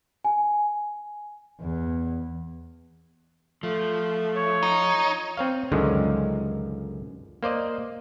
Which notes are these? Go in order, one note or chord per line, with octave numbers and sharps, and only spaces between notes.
G#5
E2
F3 A3
C#5
D#4
C4 C#5 F5
C#2 F#2 D3 D#3 F3 G#3
A#3 C5 D5 D#5